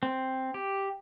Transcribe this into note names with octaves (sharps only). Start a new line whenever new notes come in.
C4
G4